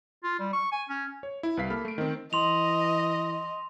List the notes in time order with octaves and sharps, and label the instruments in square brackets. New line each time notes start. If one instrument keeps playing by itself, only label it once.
[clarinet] F4
G3
C#6
G#5
C#4
[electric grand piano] C#5
E4
C2 B4 F5 B6 C7
A#3 A4 B5 F6
A3 D7
D#3 C4
[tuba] E3 [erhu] D#5 [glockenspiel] C6 F7